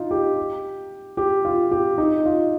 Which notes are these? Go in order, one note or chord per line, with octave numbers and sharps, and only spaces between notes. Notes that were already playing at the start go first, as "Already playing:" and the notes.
Already playing: D#4 F4
G4
G4
F4
G4
D#4
F4